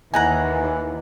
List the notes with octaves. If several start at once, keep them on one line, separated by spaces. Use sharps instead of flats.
D#2 E3 D#4 F#5 G#5 A#5 F#6